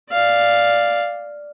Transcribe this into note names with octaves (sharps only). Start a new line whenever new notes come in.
D5 F5